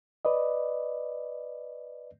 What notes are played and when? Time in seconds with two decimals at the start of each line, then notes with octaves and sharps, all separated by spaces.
0.25 B4 D5 D#5